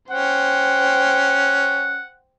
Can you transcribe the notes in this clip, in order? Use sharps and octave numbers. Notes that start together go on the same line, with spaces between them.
C#4 C5 F#5 G5